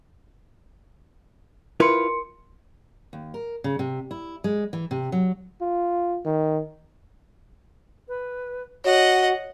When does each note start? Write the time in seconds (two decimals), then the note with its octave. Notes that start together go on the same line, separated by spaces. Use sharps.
1.80 E4 F4 A#4 B4 C6 C#7
3.13 D#2
3.34 A#4
3.64 C#3
3.79 C3
4.11 E4
4.44 G#3
4.73 E3
4.91 C3
5.12 F#3
5.61 F4
6.25 D#3
8.08 B4
8.84 F#4 C#5 D#5 F#5